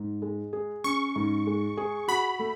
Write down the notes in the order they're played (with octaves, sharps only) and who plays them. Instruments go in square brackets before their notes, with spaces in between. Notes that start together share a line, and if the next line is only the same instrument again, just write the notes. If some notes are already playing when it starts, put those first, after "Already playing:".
Already playing: [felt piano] G#2
G#3
G#4
[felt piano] C#4 [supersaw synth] C#6
[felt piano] G#2
G#3
G#4
[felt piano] F#4 [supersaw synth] B5
[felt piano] A3